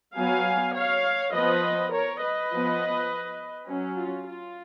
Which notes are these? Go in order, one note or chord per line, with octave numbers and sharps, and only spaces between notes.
F#3 B3 F5 G#5
C#5 F5
F3 B3 B4 D#5
A#4 C#5
B4 D#5
F3 B3
F#3 C#4
F4
F4